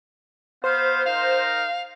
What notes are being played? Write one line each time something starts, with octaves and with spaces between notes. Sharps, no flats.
B3 C5 F5
D#4 A#4 F5